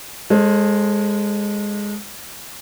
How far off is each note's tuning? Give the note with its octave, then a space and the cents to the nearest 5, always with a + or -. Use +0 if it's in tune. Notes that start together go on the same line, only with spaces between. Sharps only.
G#3 -10 A4 +0 C5 +35